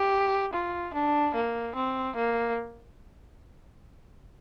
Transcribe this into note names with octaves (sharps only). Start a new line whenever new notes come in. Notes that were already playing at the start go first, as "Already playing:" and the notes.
Already playing: G4
F4
D4
A#3
C4
A#3